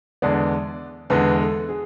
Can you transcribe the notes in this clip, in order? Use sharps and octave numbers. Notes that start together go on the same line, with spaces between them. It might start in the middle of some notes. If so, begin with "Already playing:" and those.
E2 D3 G#3 B3 D5
E2 D3 G#3 B3 B4
A4
G#4